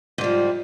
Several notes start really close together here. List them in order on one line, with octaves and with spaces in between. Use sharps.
G#2 G3 F3